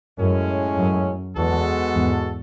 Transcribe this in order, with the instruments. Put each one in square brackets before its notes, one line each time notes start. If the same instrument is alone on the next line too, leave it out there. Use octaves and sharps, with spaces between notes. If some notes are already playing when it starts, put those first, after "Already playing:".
[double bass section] F#2 [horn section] A2 G#3 C#4
[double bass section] F#2
[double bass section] E2 [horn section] G#3 B3 F#4 A4
[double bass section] E2 G#2